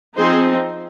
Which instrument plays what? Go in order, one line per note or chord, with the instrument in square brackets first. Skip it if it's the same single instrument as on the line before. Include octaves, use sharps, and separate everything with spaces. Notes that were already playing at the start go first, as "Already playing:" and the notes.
[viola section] F3 C4 D#4 G#4 C5